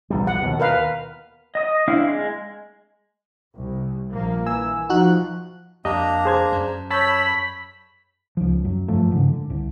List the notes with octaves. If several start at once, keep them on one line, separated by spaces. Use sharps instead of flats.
A#1 E2 G3
F#5
D#2 B2
A#4 B4 F5
D#5 D#6
C4 D4 E4 F5
G#3
C2
A#1 F3 A#3
E3 G#5 E6
F3 D#4 F#4 F#6
F2 A#3 D4 G4 D#5 A#5
G#4 C5 G#6
F#2
C#5 A5 B5 E6 G6
C#2 F3
F#2 F#3
G1 G2 F3 A3
G#2 C#3 E3
D3
C2